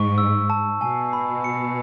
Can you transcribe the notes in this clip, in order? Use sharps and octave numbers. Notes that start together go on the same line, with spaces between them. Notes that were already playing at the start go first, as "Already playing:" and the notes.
Already playing: G#2 C#6
E6
A5
B2 G#5
B5
C#7